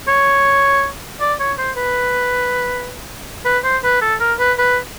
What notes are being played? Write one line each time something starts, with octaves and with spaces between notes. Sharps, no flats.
C#5
D5
C#5
C5
B4
B4
C5
B4
A4
A#4
B4
B4